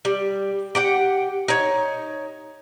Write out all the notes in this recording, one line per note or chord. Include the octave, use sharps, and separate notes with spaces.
G3
G4 F#5 G5
D#4 C#5